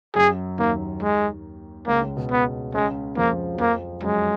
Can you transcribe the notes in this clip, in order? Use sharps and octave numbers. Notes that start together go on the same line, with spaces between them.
F#2 F#3 G#4
D#2 D#3 A#3
G#3
C#2 C#3 A#3
C#2 C#3
B2
B3
C#2 C#3 G#3
F2 F3 A#3
F#3
F2 F3 A#3
F#2 F#3 G#3